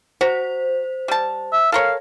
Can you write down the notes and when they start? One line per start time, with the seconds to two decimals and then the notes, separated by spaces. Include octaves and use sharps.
0.21 F#4 C5
1.08 G3 A5
1.53 E5
1.72 A4 A#4 C#5 F5